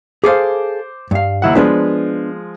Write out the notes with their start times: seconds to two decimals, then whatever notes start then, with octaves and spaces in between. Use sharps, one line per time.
0.24 G#4 A4 C5 F5 D6
1.11 G2 F5
1.42 D#2 E4 F#5
1.55 F3 G#3 B3 D4 B4